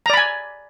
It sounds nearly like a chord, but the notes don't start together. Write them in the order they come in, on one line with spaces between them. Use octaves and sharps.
A#5 D5 B5 G#5